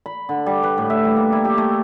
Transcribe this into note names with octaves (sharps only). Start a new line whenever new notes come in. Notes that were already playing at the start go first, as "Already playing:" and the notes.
B5
D3
G3
B4
A2
E5
G3
A#3
E4
G4
A3